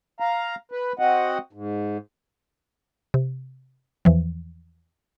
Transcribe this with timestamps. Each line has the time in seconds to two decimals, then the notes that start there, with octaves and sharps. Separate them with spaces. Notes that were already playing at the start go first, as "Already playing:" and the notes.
0.20 F5 A#5
0.72 B4
0.99 C4 F#4 D#5 F#5
1.53 G#2
3.14 C3
4.05 E2 E3 F3